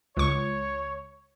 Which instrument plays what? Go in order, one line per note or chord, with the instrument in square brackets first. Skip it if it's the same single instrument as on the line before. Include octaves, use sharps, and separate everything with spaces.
[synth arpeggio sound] C#2 C#6 [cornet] C#5